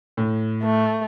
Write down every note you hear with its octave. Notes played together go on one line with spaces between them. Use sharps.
A2
A3